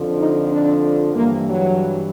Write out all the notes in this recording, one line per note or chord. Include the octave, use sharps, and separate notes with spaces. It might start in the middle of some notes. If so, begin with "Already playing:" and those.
Already playing: F2 D3 F3
D#4
D4
G2 E3 A#3
F#3